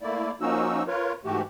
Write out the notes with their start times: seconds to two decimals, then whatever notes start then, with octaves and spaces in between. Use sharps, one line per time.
0.01 A3 A#3 E4 D5
0.41 F3 A#3 C#4 D#4 F#4 E6
0.87 F4 A#4 B4 C#5
1.25 G#2 E3 A3 F#4 G4